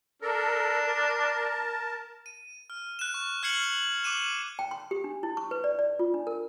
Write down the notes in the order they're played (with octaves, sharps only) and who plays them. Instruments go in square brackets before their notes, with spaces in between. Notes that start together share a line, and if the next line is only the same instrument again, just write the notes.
[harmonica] D4 [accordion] A4 A#4
[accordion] A#4 A5
[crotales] D#7
F6
F#6 E7
C#6
F6 G#6 C7 C#7 F#7
D6 F6 D#7 E7
[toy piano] G5
C6
G4
D4
E4
C#6
B4
D5
D5
F4
D4
A#4